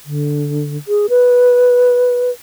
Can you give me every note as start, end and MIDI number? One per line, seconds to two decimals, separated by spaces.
0.06 0.77 50
0.88 1.07 68
1.09 2.30 71